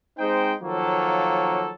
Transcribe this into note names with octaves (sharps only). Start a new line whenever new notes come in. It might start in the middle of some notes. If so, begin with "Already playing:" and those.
G#3 C4 D#4 C5 G5
D#3 F3 F#3 A#3 A4 C#5